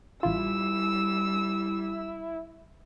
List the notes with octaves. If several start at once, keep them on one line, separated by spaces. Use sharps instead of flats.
A1 G3 E4 F4 E6